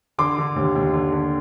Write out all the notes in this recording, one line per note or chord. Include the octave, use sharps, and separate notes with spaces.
D3 C6 D6
D3
D#2
D#2
D3
D3